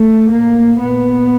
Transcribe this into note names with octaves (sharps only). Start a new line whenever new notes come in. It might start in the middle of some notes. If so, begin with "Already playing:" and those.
Already playing: A3
A2 A#3
A#2 B3